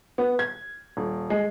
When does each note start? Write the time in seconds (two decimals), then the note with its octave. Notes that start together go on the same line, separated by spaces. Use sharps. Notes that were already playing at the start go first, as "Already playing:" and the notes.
0.18 B3
0.39 G#6
0.97 D#1
1.30 G#3